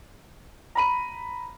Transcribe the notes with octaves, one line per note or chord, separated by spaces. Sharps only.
A#5 B5 D#7